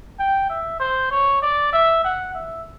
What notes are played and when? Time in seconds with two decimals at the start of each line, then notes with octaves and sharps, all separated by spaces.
0.19 G5
0.50 E5
0.80 C5
1.11 C#5
1.42 D5
1.73 E5
2.04 F#5
2.34 E5